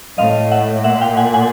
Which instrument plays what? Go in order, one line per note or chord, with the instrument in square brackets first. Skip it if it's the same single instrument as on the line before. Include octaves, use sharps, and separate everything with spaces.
[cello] A2 [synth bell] D#5 F5
[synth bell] E5 F#5
[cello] A#2 [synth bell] E5 F#5
[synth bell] F5 G5
F#5 G#5
F#5 G#5